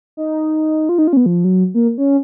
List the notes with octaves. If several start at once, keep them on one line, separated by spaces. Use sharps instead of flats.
D#4
F4
D#4
F4
C#4
B3
F3
F#3
A#3
C#4